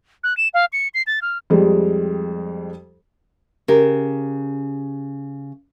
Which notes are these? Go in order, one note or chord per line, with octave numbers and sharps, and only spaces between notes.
F#6
E7
F5
C#7
C7
A6
F6
F2 G3 G#3
C#3 G4 A#4